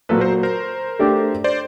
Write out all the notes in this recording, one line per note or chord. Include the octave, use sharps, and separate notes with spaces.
A#2 F#3 A#3 A4 B4
A#4 C5
A#4 C5
A3 D4 G4
C5 D5